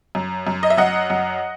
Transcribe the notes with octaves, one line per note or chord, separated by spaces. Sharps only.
F#2
F#2
D#5
E5
F#2 D#5 F#5
F#2